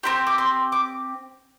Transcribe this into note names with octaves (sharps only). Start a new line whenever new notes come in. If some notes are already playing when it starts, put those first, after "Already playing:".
C4 E4 G4 C6
D6
C6
D6